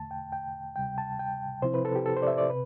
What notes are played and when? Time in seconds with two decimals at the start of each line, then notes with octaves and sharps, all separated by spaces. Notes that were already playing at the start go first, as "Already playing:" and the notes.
Already playing: E2 D3 A3 A5
0.11 G5
0.32 G5
0.76 D2 C3 G3 G5
0.98 A5
1.19 G5
1.62 C3 F3 C4 E4 C5
1.74 B4
1.85 A4
1.95 G4
2.06 A4
2.16 C5
2.22 D5
2.27 E5
2.38 D5
2.49 C3 B4